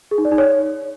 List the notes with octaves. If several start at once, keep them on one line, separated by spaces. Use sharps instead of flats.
G#4
D#4
D5
D#4
C#5